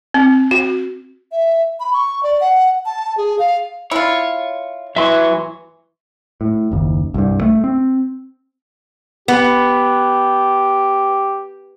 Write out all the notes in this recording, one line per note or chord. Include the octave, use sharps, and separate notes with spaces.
C4
F#4
E5
B5
C#6
D5
F#5
A5
G#4
F5
E4 F4 C#5
E3 F#3 E5 C6 C#6
A2
F#1 D#2
C2 G2
A3
C4
B3 G4